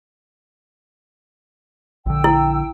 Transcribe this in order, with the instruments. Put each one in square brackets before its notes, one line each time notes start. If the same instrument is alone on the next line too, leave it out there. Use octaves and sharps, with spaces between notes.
[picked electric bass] A#1 D3 [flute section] G5 E6
[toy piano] E4